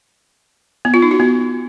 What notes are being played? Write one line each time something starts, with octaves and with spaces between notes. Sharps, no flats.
B3
F4
D#4
F#4
B3